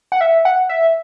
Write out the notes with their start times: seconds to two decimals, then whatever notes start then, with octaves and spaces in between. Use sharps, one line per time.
0.12 F#5
0.21 E5
0.45 F#5
0.69 E5